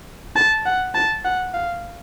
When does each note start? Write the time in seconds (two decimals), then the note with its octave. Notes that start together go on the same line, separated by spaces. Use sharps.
0.36 A5
0.66 F#5
0.95 A5
1.25 F#5
1.54 F5